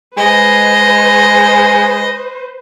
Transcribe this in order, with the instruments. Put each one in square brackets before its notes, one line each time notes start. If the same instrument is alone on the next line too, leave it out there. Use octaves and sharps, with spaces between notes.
[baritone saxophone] G#3 [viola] B4 C5 [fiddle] D#5